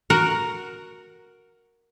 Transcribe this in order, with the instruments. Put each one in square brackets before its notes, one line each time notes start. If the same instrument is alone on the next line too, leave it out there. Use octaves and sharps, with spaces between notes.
[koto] F#4 A#4 F#5